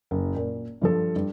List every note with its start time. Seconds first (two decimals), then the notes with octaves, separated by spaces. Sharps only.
0.11 F#1
0.36 A#2
0.81 G2 F3 A4
1.16 G2